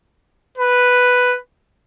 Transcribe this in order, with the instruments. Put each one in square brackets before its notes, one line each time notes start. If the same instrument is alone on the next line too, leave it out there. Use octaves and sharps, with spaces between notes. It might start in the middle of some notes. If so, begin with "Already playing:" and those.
[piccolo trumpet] B4